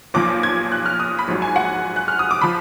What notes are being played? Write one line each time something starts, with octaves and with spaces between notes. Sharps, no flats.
B1 A#2 F3 D6
G#6
F#6
F6
D#6
B5
A#1 G#2 F#3
G#5
F#5
F#6
F6
D#6
D6
F3 B5